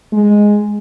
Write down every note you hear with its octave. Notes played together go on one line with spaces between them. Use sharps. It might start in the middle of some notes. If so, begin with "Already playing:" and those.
G#3